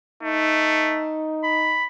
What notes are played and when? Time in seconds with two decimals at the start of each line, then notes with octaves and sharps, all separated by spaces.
0.23 A3 D#4
1.44 B5